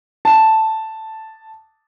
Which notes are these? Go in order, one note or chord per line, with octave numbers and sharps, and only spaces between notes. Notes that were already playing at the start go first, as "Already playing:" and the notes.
A5